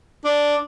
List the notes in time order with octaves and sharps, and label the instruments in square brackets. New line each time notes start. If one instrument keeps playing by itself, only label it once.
[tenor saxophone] D4